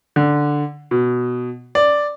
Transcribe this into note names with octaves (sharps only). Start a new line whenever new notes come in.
D3
B2
D5